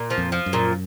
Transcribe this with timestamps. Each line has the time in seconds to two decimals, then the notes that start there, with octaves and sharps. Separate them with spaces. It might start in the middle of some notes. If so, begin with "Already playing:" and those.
Already playing: A#2
0.10 F3
0.18 F2
0.32 F3
0.46 F#2
0.53 A#2